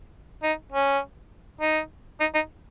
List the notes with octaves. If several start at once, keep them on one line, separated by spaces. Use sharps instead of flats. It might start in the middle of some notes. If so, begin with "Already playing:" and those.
D#4
C#4
D#4
D#4
D#4